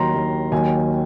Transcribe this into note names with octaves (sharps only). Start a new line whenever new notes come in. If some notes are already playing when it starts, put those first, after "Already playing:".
Already playing: D#2 D#3 F#3 A#5 C6
D#2 D#3 F#3
D#2 D#3 F#3 G#5